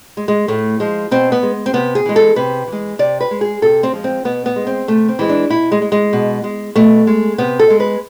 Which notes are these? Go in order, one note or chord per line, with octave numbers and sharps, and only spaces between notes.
G#3
G#3
A2 A3
F3 G#3
B2 C4
B3
G#3
C4
C3 B3
G#4
E3 G#3
A4
C3 B4
E3 G#3
C3 D5
B4
G#3
G#4
C3 A4
C4
F3 G#3
C4
B2 B3
B3
G#3
C4
C3 A3
C4
E3 G#3
D4
B2 E4
G#3
G#3
G#3
B2
G#3
B2 A3
G#3
C3 B3
A4
G#3
B4